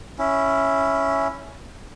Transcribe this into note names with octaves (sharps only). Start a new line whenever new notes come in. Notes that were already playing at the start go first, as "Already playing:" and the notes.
C#4 E4